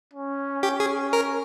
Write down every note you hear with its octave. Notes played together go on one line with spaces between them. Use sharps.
C#4
G4
G#4
A#4